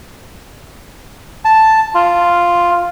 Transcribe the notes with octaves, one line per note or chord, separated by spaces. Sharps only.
A5
F4